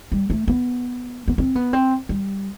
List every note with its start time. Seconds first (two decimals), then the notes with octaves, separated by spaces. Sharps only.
0.12 G3
0.30 A3
0.48 B3
1.28 B3
1.38 C4
1.55 B3
1.73 C4
2.09 G3